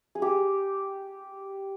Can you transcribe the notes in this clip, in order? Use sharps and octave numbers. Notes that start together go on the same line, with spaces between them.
G#4
G4